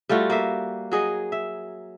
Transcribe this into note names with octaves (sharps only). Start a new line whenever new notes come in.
G3 A3 F4 F#4
A#3 E5
F#3 G#4 D#5
E5